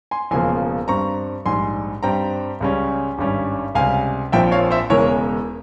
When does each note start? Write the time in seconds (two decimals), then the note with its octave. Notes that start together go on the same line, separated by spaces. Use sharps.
0.11 G#5 C6
0.31 E1 E2 C#3 F3 A#3 G#5 C6
0.88 G2 G3 C4 A#5 C#6
1.45 A#1 G#2 G3 G#5 C6
2.03 G2 G3 C4 G5 A#5
2.60 C#2 C#3 G3 C#4
3.18 G#1 G2 G3 C#4
3.75 C#2 C3 G3 F5 G#5
4.32 A#1 A#2 F3 C4 E5 G5
4.52 C#5 F5
4.70 C5 E5
4.90 E1 E2 C#3 E3 G#3 A#4 C#5